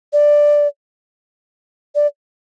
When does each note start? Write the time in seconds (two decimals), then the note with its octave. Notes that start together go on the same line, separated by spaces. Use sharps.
0.13 D5
1.95 D5